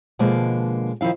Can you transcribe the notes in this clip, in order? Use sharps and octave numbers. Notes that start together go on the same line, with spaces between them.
B2 D3 F3 G#3 A#3
D#3 F3 G#3 E4 F5